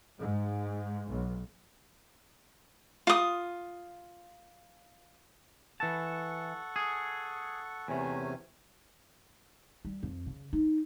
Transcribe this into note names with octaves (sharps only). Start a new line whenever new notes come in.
G#2
B1
F4 D#6
E3 A4 F#5 A5 C#6
G#4
E2 C3 A3 C#4 G#5
G3
F2
C#3
D#4